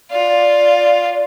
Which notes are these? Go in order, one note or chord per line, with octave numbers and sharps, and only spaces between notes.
F4 D5